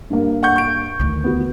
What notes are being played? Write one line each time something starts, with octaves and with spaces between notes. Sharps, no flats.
G2 A#3
F#5 C#6 G6
C#6 D7
D2 D#3
B3 F#4